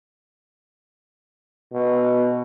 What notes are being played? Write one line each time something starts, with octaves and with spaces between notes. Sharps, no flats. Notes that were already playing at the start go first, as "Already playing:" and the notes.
B2